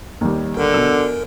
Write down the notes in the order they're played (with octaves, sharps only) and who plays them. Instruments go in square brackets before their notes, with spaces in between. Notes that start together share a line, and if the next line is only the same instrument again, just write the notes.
[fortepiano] D#2 G3
[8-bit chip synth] G1 A#4 [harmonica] D3
[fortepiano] B2 E6